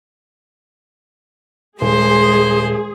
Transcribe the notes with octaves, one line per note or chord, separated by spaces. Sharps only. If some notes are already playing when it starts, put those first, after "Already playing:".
D#1 G#3 G#4 C5 C6